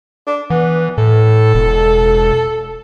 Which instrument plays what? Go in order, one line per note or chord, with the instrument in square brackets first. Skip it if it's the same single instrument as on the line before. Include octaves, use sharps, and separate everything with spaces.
[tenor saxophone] D4
[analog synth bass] E3 [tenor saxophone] B3
[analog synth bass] A2 [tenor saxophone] A4
[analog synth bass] E1